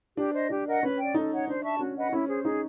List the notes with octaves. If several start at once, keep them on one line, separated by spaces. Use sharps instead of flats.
D4 G4
C5 D#5
D4 G4
A#4 D#5 F#5
C#4 B4
D5 G5
D#4 A4
C#5 F#5
D4 C5
E5 A5 C#6
C#4 F#4
B4 D#5 F#5
C#4 E4
G#4 C5
D#4 G#4